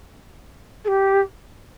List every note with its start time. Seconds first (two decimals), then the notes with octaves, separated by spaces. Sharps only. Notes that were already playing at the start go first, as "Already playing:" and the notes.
0.84 A4
0.88 G4